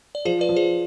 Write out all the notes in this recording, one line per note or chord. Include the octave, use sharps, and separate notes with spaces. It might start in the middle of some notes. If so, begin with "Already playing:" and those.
D5
F3 G#4 C5
B4 D5
F3
G#4 C5